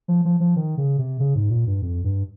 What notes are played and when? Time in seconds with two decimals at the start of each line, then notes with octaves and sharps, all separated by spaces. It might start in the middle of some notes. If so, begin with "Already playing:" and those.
0.08 F3
0.25 F3
0.40 F3
0.56 D#3
0.78 C#3
0.98 C3
1.20 C#3
1.35 G#2
1.50 A#2
1.67 G2
1.82 F2
2.04 G2